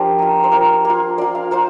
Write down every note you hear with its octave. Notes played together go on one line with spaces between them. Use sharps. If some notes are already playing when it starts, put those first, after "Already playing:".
Already playing: F3 D4 G4 A#4 C5 D5
A#3 F4
C5
A#3 F4 A#4
A#3 F4
A#3 F4 D5
F5
A#3 F4 C5